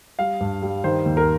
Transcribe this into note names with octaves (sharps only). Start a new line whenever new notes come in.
G3 F5
G2
G3
D#3 C5
D#2
A#4